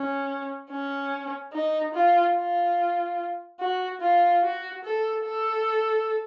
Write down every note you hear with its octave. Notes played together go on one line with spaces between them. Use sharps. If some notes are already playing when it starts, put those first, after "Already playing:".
Already playing: C#4
C#4
D#4
F4
F4
F#4
F4
F#4
A4
A4